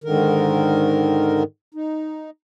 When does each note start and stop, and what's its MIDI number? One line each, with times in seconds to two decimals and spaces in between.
0.04 1.43 44
0.04 1.43 50
0.04 1.43 51
0.04 1.43 70
1.74 2.30 63